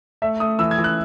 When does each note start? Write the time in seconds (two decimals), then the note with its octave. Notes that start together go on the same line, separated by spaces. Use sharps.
0.22 A3 E5
0.40 A3 D#6
0.59 E3 E6
0.71 G#6
0.78 E3
0.84 F#6